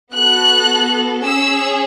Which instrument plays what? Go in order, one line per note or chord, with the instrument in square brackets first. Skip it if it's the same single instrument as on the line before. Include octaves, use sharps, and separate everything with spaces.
[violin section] B3 F#4 A4 F#6
C#4 G#4 E6